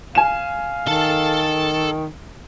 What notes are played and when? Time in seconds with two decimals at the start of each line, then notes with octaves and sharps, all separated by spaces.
0.15 F5 G#5 E7
0.88 D#3 A4 A5